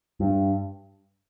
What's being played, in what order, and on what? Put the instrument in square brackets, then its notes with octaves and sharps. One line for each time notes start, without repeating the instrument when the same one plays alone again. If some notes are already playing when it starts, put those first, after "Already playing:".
[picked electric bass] G2